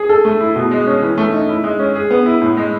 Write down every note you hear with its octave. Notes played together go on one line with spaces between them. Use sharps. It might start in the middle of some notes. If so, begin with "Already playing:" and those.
Already playing: G#4
A4
A3
E4
B2
G#3
C#4
E3
A3
D#4
E4
G#3
C#4
G#4
B3
E4
A2
G#3